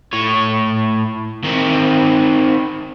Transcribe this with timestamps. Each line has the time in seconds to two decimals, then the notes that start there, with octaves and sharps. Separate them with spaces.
0.13 A2 C#5
1.44 D#3 C4